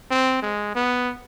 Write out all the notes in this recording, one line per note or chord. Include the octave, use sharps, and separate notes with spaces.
C4
G#3
B3